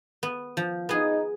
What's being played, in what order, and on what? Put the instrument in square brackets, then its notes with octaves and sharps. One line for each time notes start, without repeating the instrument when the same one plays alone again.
[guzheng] B3
F3
[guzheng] B3 G#4 [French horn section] D#4